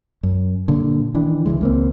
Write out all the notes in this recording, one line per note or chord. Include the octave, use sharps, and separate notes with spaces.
F#2
G2 A#2 D3
D#3 E3 D4
C#2 G#2 E3 G#3
C#2 A#3 C4